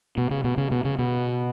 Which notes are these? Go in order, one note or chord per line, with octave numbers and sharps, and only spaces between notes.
B2
C#3
B2
C#3
B2
C#3
B2